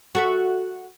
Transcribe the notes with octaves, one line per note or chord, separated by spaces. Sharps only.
F#4 A4 E5